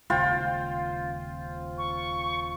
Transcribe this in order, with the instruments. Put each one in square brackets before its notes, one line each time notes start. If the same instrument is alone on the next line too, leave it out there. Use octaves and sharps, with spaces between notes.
[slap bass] D#1 C#3 G#3 [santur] F4 C5 G5
[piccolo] C#6